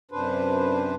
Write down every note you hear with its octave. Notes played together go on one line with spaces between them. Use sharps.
F#2 C3 D4 B4 C5